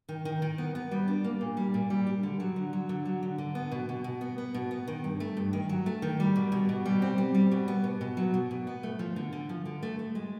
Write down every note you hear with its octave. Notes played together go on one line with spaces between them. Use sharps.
D#3
D#3
D#3
B3
B3
G3
D4
A#3
A#2
G3
A#2
G3
D4
D3
F#3
D3
F#3
D3
F#3
D3
D3
B3
B2
B2
B2
B3
B3
B2
B3
D#3
G2
A3
G2
D#3
F#3
A3
D#3
G3
B2
B2
B2
G3
C4
G3
G3
B2
B3
B2
B2
F#3
B2
B2
B3
A3
F3
D3
D3
F3
D3
A3
A3
G#3